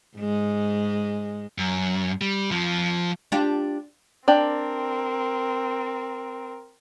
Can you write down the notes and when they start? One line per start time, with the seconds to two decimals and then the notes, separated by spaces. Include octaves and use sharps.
0.17 G#2 G#3
1.58 F#2
2.21 G3
2.50 F2 F3
3.32 D4 F4 G4
4.28 C4 D4 G4 A#4 D5